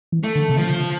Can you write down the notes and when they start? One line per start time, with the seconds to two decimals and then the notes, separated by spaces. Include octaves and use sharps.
0.12 E3
0.24 A3
0.36 D3
0.49 C3
0.57 D3 F3